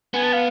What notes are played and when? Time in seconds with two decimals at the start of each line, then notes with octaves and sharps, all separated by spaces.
0.14 B3 G#5
0.23 A5
0.33 F5